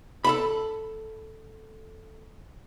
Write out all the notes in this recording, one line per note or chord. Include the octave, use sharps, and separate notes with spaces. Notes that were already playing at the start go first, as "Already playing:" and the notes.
A4 A5 B5